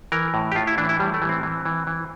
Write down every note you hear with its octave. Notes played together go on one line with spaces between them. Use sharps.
E3 A#4
A2
G4
A2 F4
E4
E3 D4
E4
A2 G3
A3
E3
C4
E3
E3
E3